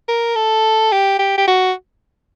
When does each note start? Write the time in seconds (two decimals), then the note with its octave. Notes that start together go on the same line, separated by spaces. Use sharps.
0.08 A#4
0.36 A4
0.92 G4
1.19 G4
1.38 G4
1.48 F#4